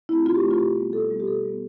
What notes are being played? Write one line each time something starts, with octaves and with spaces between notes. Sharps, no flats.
A3 C4 E4
B2 F4
G4
A3 C4 E4 F4
B2 G4
G3 B3
B2 A4
G3 B3
G4
B2 A4
G3 B3